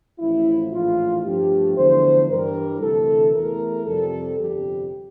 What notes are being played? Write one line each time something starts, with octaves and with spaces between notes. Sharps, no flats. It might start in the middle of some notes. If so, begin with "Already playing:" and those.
A1 A2 F3 E4
A#1 A2 E3 A3 F4
G2 F3 A3 G4
E2 D3 F3 A3 C5
G2 E3 G3 A#4
D2 C3 E3 A3 A4
E2 E3 A3 A#4
F2 C3 G3 A4
G1 F2 C3 G3 G4